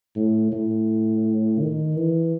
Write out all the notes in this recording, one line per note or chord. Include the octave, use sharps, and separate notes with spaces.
A2
A2
D#3
E3